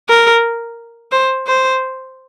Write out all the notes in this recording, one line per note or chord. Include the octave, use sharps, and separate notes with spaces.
A#4
C5
C5